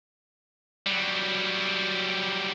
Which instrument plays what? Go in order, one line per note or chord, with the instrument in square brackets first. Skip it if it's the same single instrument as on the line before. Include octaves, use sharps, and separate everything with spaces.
[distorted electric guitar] F#3 G3